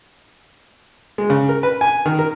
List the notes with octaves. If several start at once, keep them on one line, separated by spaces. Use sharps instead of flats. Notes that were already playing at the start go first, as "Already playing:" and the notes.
G#3
C#3
A#4
B4
G#5
D#3
A#4